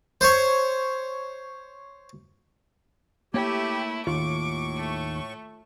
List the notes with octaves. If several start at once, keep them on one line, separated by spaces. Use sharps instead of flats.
C5 C#5
A3 A#3 E4 G4 C#5 G5
D#2 A2 F4 C#6 D6
A3